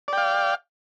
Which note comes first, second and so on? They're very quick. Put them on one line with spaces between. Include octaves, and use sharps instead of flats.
D5 G5 F5